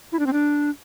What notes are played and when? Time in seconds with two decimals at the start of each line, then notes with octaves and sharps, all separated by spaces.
0.12 E4
0.19 D4
0.27 C4
0.33 D4